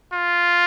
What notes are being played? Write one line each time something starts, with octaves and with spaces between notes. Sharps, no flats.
F4